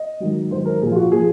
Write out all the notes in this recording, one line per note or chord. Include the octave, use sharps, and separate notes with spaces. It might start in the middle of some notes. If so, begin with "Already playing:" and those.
Already playing: D#5
G#2 D#3 F#3
G#2 D#3 F#3 C5
A#4
A#2 F3 G#4
F4
F#4
A#2 F3 G#4